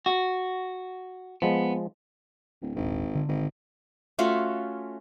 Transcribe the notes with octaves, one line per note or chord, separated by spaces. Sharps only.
F#4
F3 G#3 B3
D1
D#1 G#1 D4
D3
G#1
A3 C#4 F4 F#4